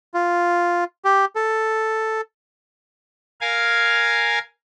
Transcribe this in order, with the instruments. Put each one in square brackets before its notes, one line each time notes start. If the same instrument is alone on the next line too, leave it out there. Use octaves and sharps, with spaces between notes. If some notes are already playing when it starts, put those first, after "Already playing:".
[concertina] F4
G4
A4
[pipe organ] A#4 F5 G#5